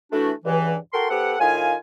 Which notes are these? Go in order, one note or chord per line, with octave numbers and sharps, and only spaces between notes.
E3 A3 D4 F#4
C#2 G2 E3
F#4 A4 A#4 G5 C6
B3 G4 A4 C5 F#5
A2 D#3 F4 F5 G#5